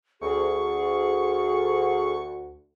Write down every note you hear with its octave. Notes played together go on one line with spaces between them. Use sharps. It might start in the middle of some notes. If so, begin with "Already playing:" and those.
D2 G#4 C#6